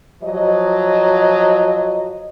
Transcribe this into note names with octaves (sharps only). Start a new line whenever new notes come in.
F3 F#3 D#5